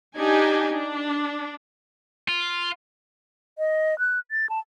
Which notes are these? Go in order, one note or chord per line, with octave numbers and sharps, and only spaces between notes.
D4 D#4 G4 G#5
D4
F4
D#5
F#6
A6
A5